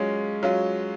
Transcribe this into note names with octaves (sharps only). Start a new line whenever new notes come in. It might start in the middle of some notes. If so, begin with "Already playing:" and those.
Already playing: F#3 G#3 C#4 F4
F#3 C#4 F4